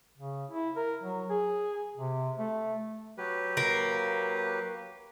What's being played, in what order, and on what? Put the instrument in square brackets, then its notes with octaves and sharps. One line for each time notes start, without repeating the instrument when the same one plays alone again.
[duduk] C#3
E4
A#4
F#3
G#4
C3
A3
[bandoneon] F#3 G4 B4
[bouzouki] A#3